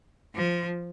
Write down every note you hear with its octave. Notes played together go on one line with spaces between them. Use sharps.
F3